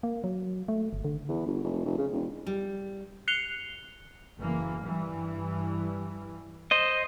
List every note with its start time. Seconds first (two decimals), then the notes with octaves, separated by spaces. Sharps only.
0.03 A#3
0.24 F#3
0.68 A3
0.93 G1
1.05 D3
1.29 E2
1.46 G1
1.64 F1
1.86 F1
1.98 C#3
2.12 E1
2.46 G3
3.28 F#6 C7 C#7 F7 G7
4.38 F#1 E3 A#3
4.83 G2 E3 G3
6.71 C5 D#5